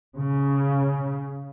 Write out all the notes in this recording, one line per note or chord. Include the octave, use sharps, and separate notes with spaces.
C#3